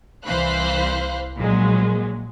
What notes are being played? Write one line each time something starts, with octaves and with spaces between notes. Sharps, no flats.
C2 E3 C5 F5 B5 F#6
A#1 A#2 F#3 G#3